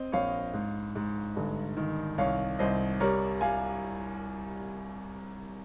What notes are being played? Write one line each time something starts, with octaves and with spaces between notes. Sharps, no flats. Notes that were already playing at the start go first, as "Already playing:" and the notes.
Already playing: C4 D#5
A#1 C#5 F5
G#2
G#2
G1
D#3
C2 C#5 F5
C2 C5 D#5
G3 A#4 C#5
G3 F5 G#5